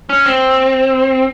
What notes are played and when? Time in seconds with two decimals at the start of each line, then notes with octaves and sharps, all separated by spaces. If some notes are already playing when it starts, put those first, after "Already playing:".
0.09 C#4
0.26 C4